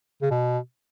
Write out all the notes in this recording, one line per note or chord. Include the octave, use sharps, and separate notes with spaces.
C#3
B2